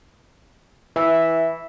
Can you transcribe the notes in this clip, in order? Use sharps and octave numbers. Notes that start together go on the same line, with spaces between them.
E3 E5